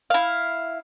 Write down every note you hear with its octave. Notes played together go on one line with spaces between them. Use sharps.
E4 F5